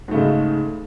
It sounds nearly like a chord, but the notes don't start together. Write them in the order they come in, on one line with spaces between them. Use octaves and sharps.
G#2 A3 C#3 G#3